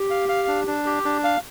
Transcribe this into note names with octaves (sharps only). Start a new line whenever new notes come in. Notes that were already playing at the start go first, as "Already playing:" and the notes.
Already playing: G4
F5
F5
D4
D4
G4
D4
F5